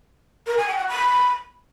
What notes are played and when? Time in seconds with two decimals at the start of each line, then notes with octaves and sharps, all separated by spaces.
0.47 A#4
0.57 G#5
0.67 G5
0.78 F#5
0.88 B5